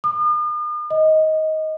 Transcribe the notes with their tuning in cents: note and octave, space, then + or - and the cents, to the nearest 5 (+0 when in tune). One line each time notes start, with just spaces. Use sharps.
D#6 -45
D#5 +15